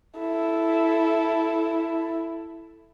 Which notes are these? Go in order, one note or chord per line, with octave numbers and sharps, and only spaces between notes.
E4 A4